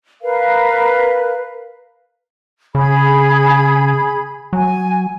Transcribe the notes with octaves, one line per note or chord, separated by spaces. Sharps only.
A#4 B4 F5
C#3 G#4 B5
F#3 G#5